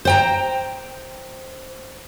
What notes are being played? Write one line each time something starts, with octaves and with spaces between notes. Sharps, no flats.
C5 G5 A#5